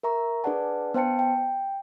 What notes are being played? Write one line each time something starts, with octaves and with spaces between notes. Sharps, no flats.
A#4 E5 A#5 C#6
D4 G#4 B4 D5 F#5 A5
B3 C5 G5 A5 C#7
G5